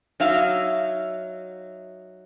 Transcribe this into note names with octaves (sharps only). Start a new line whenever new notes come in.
F#3 D#4 E5 F5